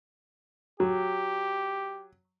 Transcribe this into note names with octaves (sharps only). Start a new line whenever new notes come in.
F#3 G4